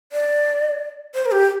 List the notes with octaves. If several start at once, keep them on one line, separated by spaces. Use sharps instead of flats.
D5
C5
A#4
G4